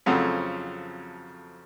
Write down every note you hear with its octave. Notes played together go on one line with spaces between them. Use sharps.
F2 C#3 F#3 A3 C4